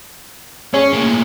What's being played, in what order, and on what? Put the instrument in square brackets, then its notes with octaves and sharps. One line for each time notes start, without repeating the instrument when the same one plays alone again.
[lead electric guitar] C#4 [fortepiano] G#4 C#5
[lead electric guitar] A2 A#3